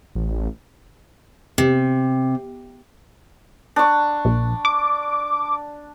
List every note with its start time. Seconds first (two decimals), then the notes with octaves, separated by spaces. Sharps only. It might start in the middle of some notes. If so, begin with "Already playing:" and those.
0.15 A1
1.58 C3
3.76 D4 C#6
4.25 A#1
4.65 D6